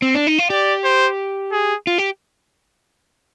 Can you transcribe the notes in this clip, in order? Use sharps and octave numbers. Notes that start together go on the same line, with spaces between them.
C4
D4
D#4
F4
G4 D5
C5
G#4
F4
G4